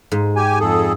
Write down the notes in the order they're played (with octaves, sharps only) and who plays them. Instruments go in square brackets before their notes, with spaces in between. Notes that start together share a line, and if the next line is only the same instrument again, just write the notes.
[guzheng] G#2
[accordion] G4 G#5
F2 G#4 A4